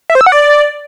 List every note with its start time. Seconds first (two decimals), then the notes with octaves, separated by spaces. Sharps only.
0.10 E5
0.15 C5
0.21 E6
0.26 F#5
0.32 D5